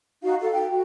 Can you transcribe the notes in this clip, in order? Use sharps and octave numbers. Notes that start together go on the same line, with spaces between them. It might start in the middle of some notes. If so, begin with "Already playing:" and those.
D#4 F#4 F5
A4 F5
G5
F#4